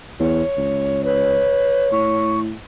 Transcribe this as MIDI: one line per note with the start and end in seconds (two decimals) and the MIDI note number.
0.20 0.42 40
0.20 1.04 73
0.57 1.53 37
1.05 1.91 71
1.05 2.43 73
1.92 2.54 45
1.92 2.40 85